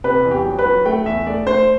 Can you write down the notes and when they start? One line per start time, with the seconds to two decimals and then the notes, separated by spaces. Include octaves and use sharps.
0.04 C3 B4
0.25 E2
0.31 G4
0.45 F#3
0.59 B4
0.66 F#3
0.85 A3 G5
1.06 E2 E5
1.26 A3 D5
1.47 A3 C5